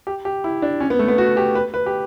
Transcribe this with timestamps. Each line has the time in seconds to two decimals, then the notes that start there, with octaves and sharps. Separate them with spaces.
0.07 G4
0.25 G4
0.44 E4
0.62 D4
0.80 C#4
0.90 B3
0.99 A3
1.08 B3
1.18 F#4
1.37 G4
1.55 B4
1.74 B4
1.86 G4